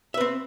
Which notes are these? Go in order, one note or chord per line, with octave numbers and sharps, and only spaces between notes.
C4 B4 E5